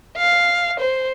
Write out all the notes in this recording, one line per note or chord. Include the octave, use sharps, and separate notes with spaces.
F5
C5